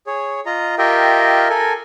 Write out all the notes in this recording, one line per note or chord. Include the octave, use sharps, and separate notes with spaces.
G#4 C#5
F4 D#5 A#5
F4 G4 A#4 D#5 E5 G5
A4 A#4 G#5